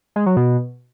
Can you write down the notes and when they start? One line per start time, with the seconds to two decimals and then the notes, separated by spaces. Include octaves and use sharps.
0.16 G#3
0.26 F#3
0.37 B2